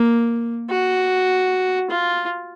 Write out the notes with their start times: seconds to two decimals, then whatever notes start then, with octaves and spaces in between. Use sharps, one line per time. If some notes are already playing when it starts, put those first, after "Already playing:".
Already playing: A#3
0.70 F#4
1.91 F4